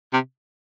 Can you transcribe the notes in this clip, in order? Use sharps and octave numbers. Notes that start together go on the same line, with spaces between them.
C3